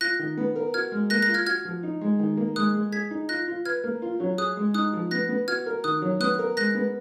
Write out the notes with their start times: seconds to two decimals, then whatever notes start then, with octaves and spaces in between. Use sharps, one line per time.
0.01 F4 F#6 A#6
0.19 D#3
0.37 B3
0.56 A#4
0.74 F#4 F6 G#6
0.92 G#3
1.10 A#3 F#6 A#6
1.22 F#6 A#6
1.28 F4
1.34 F6 G#6
1.46 F#4 F6 G#6
1.65 F3
1.83 D#4
2.01 G#3
2.19 D#3
2.37 A#3
2.56 G#3 D#6 F#6
2.75 G#3
2.92 G#4 G#6 B6
3.11 D#4
3.29 F4 F#6 A#6
3.48 F4
3.65 B4 F6 G#6
3.84 A#3
4.02 F4
4.20 F#3
4.38 G#4 D#6 F#6
4.57 G#3
4.74 D#4 D#6 F#6
4.93 F3
5.11 B3 F#6 A#6
5.29 B3
5.48 F#4 F6 G#6
5.66 A#4
5.84 D#3 D#6 F#6
6.02 F#3
6.20 B3 D#6 F#6
6.39 A#4
6.57 G#3 F#6 A#6
6.75 B3